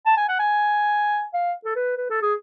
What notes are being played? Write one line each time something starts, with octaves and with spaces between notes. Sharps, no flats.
A5
G#5
F#5
G#5
F5
A4
B4
B4
A4
G#4